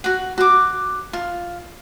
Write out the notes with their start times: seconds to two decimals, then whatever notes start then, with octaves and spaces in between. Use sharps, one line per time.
0.04 F#4 F#5
0.38 F#4 D6
1.13 F4